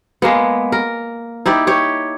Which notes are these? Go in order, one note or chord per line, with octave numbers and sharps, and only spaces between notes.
G#3 A#3 B3
A#4
D#4 E4 G4 D5
G4 C#5